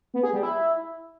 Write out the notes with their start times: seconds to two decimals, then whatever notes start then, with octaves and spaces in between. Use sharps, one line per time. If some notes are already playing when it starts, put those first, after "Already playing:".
0.14 B3
0.23 G#4
0.33 G3
0.43 E4